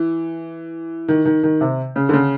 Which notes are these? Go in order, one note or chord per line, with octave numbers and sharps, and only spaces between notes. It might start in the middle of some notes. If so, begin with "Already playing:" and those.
Already playing: E3
D#3
D#3
D#3
C3
C#3
D3
C#3